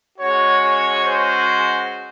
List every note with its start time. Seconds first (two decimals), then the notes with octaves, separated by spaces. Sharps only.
0.19 G#3 C#4 F#4 C#5
0.62 C#5
1.04 C5